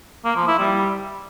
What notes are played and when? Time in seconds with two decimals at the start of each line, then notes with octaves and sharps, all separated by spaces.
0.25 A#3
0.36 F3
0.47 E4
0.59 G3